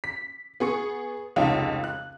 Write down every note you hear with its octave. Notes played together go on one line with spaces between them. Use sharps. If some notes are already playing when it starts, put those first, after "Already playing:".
B6
B3 G#4 C#6 C#7
F1 C#2 D#4 C#5 G5
F#6